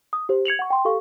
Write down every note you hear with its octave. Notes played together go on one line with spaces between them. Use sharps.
D#6
G4 C5
G#6 C#7 F7 F#7
F#5 C#6
G5 C6
G4 A4 F5 C#6